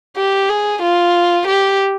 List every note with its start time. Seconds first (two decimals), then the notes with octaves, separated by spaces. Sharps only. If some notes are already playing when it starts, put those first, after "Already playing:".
0.17 G4
0.49 G#4
0.83 F4
1.47 G4